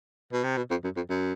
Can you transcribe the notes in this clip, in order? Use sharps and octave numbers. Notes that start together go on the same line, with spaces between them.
B2
C3
B2
F2
F#2
F2
F#2